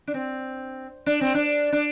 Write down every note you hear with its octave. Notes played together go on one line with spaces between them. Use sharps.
D4
C4
D4
C4
D4
D4